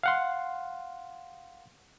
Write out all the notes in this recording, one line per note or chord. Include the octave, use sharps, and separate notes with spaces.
F5 F#5 C6